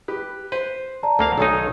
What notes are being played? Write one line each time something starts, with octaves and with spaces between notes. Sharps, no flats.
G4 B4
B4 C5
D5 A5 A#5
D2 A3 A#3 F5
B1 D#3 D#4 A4 C#5 G#5